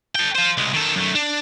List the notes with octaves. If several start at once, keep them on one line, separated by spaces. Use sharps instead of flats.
A4 G5
F4 C5
C2 G#3
D#3 A4
F#2 A3
D4